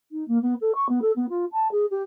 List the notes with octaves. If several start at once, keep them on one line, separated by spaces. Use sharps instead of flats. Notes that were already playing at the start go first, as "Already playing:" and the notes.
D#4
A#3
B3
A4
C#6
B3
A4
B3
F4
A5
G#4
G4